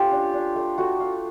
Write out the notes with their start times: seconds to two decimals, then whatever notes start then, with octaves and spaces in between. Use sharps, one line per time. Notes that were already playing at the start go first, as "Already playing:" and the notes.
Already playing: A3 C#4 F4 G4
0.11 D4
0.33 D4
0.55 A3
0.78 A3 F#4
1.00 F4